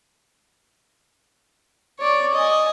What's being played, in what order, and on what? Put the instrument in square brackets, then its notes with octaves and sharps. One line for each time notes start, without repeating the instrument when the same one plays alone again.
[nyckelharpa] C#5 D5
D#5 G#5